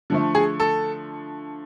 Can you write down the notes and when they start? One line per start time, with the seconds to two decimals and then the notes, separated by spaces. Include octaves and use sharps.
0.10 D3 F3 A3
0.35 G#4
0.60 A4